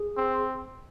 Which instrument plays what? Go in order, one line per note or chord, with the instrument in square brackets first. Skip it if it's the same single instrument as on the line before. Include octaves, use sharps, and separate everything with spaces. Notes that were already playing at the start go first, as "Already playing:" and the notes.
Already playing: [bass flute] G#4
[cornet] C4